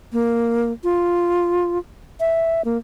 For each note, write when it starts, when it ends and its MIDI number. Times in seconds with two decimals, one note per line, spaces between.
0.13 0.72 58
0.84 1.78 65
2.20 2.62 76
2.65 2.77 58